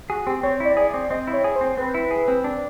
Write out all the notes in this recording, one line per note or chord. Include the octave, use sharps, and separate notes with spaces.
F#4 G#4
C4 G4
C4 C#5
E4 D5
G#4
D5
C4
C4 D#5
E4
C#5
G#4
C5
C4
C4 B4
E4
G#4
C4
D4